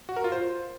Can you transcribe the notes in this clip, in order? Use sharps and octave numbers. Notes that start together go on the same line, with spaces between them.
F#4
A#4
F4
C5